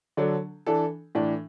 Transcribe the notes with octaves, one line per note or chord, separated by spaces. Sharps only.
D3 F#3 D4 A4
E3 D4 A4
A2 E3 D4